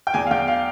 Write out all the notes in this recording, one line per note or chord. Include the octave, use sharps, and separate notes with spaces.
G5
E2 G#5
F5
E2 G5
F5